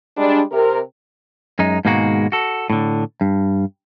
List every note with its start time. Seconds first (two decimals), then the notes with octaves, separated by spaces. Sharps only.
0.17 G3 G#3 D4
0.51 C3 A#4
1.59 F#2 G#3 D#4
1.85 G#2 B2 D#3 G#3 A#3 F#4
2.32 F#4 A4
2.70 A2 D3
3.21 G2